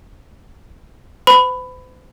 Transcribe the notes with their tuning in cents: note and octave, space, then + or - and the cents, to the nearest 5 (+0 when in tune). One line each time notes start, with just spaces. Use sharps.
C5 -45 B5 +15